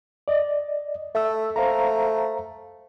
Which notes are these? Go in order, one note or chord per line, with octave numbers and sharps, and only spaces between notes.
D5 D#5
A3 E5 E6
A3 C5 F5 A#5